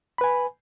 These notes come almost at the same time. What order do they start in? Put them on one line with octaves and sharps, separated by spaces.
B5 B4 G#5